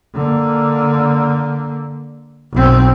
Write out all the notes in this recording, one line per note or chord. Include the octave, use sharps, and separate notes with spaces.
D3 A#3
B1 C4